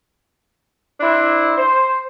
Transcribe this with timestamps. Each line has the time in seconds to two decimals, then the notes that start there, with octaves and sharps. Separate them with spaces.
1.00 C4 D4 E4
1.57 C5